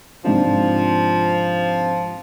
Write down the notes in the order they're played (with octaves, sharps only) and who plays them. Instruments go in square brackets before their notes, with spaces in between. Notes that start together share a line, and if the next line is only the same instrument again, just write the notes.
[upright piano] G#2 C3 D4 [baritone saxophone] F3